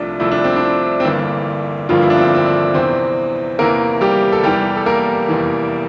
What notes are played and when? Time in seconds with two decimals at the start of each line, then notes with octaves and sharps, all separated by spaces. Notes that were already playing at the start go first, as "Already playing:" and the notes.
Already playing: C2 C3 F3 A3 D4
0.20 C2 C3 F3 A3 E4
0.32 D4
0.44 C4
0.56 D4
1.00 C4
1.05 G1 G2 E3 A#3 D4
1.89 G1 G2 E3 F3 A#3 F4
2.02 E4
2.10 D4
2.18 C4
2.35 C4
2.46 D4
2.74 E2 C3 E3 C4 C5
3.59 E2 C3 E3 A#3 A#4
4.01 G3 G4
4.32 A4
4.43 F1 E2 E3 G3 G4
4.76 A4
4.86 A#3 A#4
5.28 F1 E2 E3